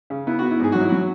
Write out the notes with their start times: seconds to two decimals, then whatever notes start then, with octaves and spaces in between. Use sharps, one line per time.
0.10 C#3
0.27 B3 E4
0.39 F#4
0.43 B3
0.51 E4
0.60 G#2 G#4
0.72 F#3 F#4
0.81 E4
0.89 F#3 F#4